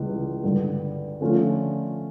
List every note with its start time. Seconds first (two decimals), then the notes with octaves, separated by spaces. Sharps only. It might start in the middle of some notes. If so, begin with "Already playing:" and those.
Already playing: C#2 C#3 E3 G3
0.43 G2 D3 G3
1.21 D3 F3 A3 C#4 F4